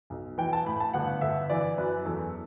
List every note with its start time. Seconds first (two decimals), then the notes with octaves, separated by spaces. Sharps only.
0.10 B1
0.38 E3 G5
0.53 A5
0.66 A2 B5
0.80 A5
0.93 G1 F#5
1.21 G1 E5
1.50 E3 D5
1.78 F#2 B4
2.05 E2 A4